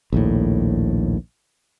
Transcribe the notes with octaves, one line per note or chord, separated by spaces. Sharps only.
A#1 D#2 A2